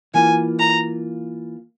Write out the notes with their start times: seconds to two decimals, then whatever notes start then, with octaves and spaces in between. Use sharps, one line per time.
0.14 E3 A#3 F4 G#5
0.59 A#5